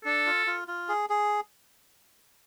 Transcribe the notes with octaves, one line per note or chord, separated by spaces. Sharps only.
D4 A4
F4
F4
F4
G#4
G#4